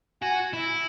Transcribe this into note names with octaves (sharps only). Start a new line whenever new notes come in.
F#4 G#5
E4